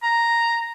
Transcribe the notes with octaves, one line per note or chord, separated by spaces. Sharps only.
A#5